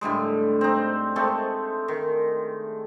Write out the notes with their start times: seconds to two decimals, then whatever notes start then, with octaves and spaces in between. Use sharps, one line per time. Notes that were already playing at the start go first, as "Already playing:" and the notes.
0.01 A2 D3 G3 G#3
0.61 C4 D#4
1.16 G#3 A3 C4 A4
1.88 D#3